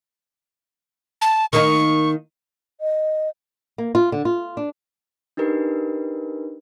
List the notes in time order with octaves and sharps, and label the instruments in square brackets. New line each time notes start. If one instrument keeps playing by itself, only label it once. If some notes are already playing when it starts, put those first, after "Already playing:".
[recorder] A5
[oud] D#3 A#3 D#4 [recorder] C#6
[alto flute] D#5
[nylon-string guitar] A#3
F4
D3
F4
D4
[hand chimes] D4 D#4 G4 A#4 B4